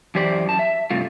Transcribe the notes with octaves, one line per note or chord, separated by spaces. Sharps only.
F#2 E3 G4 C5 D5
F#2 A5
E5
G2 C3 A3 F4